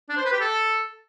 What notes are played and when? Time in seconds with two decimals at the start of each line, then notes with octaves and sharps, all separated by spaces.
0.09 D4
0.17 C5
0.25 B4
0.33 G4
0.41 A4